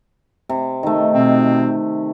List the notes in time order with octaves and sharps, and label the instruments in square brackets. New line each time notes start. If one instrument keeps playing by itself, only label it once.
[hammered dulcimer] C3
D#3 A3
[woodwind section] B2 C4